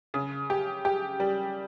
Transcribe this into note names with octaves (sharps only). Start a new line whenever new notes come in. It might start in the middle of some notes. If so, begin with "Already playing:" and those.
C#3
G4
G4
G3